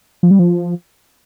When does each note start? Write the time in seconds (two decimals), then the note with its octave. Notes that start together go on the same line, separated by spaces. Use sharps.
0.23 F3
0.31 G3
0.39 F3